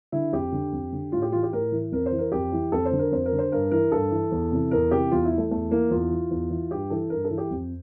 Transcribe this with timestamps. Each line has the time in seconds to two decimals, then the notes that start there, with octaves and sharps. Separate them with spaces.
0.12 D3 E4
0.33 F2 G4
0.52 D3
0.72 F2
0.92 D3
1.12 A2 F4
1.22 G4
1.32 E3 F4
1.43 G4
1.53 A2 A#4
1.72 E3
1.92 F2 A#4
2.06 C5
2.12 E3
2.19 A#4
2.32 F2 G4
2.52 E3
2.72 F2 A4
2.85 C5
2.92 D3
2.99 A#4
3.11 F2 C5
3.26 A#4
3.32 D3
3.38 C5
3.52 G2 A#4
3.71 E3 A#4
3.92 G2 A4
4.11 E3
4.31 E2
4.51 C3 E3
4.71 E2 A#4
4.91 C3 E3 G4
5.11 E2 F4
5.25 E4
5.32 E3
5.38 A3
5.51 E2 A3
5.71 E3 A#3
5.91 E2 F4
6.11 E3
6.31 E2
6.50 E3
6.71 G2 G4
6.90 E3 A4
7.10 G2 A#4
7.24 A4
7.30 E3
7.38 G4
7.50 F2